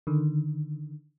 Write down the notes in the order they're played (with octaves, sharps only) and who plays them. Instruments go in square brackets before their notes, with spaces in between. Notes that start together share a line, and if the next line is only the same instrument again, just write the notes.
[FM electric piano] D3 D#3